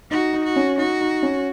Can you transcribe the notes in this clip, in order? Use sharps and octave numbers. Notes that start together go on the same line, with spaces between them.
D#4 F#4
D#4
F#4
C#4
D#4 F#4
D#4
C#4